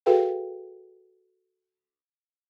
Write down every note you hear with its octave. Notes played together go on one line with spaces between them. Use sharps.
F#4 G#4 A4 B4 F5 G5